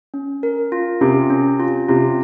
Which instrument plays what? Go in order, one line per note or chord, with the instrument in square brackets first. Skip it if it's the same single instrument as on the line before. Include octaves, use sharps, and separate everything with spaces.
[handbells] C#4
A#4
F4
[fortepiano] C3 [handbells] C#4
[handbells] C#4
F4
[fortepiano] C3 [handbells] F4